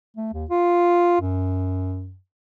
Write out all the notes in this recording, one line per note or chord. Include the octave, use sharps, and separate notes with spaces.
A3
D#2
F4
F#2